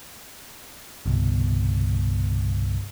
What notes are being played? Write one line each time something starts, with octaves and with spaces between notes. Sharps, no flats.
G1 C2 B2